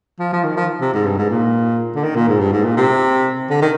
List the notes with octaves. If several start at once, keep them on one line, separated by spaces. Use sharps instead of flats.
F3
F3
D#3
F3
C3
G#2
G2
G#2
A#2
D3
D#3
A#2
G#2
G2
G#2
A#2
C3
D3
D#3